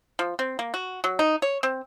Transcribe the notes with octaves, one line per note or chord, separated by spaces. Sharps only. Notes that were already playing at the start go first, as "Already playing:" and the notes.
F3
C4
A#3
F#4
F#3
D#4
C#5
C4